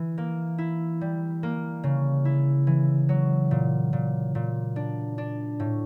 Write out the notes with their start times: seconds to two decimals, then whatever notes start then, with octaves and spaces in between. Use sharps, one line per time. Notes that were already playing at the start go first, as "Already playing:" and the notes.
Already playing: E3
0.18 A#3
0.58 E4
1.01 G3
1.43 A#3
1.83 C#3
2.25 E4
2.67 E3
3.09 F#3
3.51 A#2
3.93 A#2
4.35 A#2
4.76 D4
5.18 D4
5.60 A2